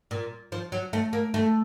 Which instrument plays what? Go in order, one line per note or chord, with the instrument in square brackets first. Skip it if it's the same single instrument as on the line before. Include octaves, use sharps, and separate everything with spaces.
[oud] A#2
F3
F#3
A3
A#3
A3